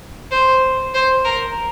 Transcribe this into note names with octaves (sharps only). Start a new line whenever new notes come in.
C5
C5
A#4